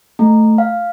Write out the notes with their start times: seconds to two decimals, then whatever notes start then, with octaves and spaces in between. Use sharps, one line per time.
0.19 A3
0.58 F5